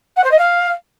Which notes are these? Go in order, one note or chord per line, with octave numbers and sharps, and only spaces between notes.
F#5
C5
D#5
F5